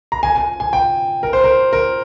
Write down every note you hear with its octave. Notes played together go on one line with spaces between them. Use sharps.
A#5
G#5
G#5
G#5
G5
A#4
C5
A#4
A#4